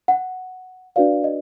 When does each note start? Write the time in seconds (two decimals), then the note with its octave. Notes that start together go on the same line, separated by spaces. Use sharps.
0.08 F#5
0.96 D4 F#4 B4 D5 F5
1.24 D#5